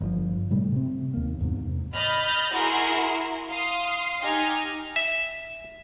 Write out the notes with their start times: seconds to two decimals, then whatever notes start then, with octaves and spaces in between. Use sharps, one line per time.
0.01 G1 F3
0.51 A2 C3 G3 A3
0.72 C3 C4
1.14 D#2 A#3
1.40 E2 G#2 C3
1.94 D#5 B5 F6 G6 A6
2.53 E4 F#4 G#4 A#4 C6
3.50 F5 C6 D#6
4.22 D#4 G4 D#5 G#5 F6
4.96 E5